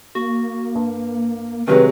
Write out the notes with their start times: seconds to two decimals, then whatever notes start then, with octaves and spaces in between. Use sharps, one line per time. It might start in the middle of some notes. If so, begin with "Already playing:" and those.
0.15 A#3 F#4
0.75 G2
1.68 C3 D#3 F#3 G#3 B4